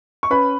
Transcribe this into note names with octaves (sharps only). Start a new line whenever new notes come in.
C#6
C#4 B4 B5